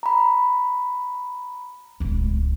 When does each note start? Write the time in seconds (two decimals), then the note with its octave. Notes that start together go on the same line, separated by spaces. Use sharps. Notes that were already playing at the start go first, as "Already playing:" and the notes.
0.03 A#5 B5
2.00 D1 C#2